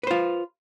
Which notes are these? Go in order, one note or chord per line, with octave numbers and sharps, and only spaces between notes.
F4 B4 C5